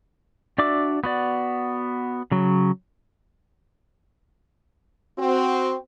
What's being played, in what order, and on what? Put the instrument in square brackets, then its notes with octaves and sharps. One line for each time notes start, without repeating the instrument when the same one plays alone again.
[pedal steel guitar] D4 F#4 D5 E5 D6
B3 F#4 D5
C#3 F#3
[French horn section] C4 F#4